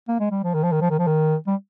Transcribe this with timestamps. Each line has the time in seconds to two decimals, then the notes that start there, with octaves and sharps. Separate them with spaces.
0.08 A#3
0.20 G#3
0.31 G3
0.43 F3
0.54 D#3
0.63 F3
0.72 D#3
0.81 F3
0.90 D#3
0.99 F3
1.07 D#3
1.47 G3